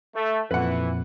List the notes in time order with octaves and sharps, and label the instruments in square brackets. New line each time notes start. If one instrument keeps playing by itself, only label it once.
[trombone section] A3
[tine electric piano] F2 A#2 [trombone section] E3 [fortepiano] B4 F#5